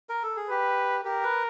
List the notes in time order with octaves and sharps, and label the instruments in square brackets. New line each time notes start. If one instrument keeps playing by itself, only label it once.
[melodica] A#4
A4
G#4
[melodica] G4 [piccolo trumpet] B4
[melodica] G4 [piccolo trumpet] A#4
[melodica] B4